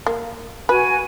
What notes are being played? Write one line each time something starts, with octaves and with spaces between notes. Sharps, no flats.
A#3
F#4 B4 G#5